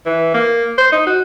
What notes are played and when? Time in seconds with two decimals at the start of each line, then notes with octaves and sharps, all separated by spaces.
0.05 E3
0.34 A#3
0.78 C5
0.92 D#4
1.06 F#4